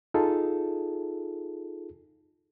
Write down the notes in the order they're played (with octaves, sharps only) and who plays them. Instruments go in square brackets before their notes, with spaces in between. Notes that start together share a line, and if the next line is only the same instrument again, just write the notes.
[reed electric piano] D#4 F4 G#4 A4